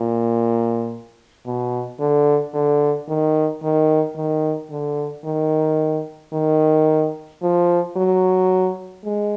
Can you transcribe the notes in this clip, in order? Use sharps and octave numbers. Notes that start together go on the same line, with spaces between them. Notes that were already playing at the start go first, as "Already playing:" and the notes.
Already playing: A#2
B2
D3
D3
D#3
D#3
D#3
D3
D#3
D#3
F3
F#3
G#3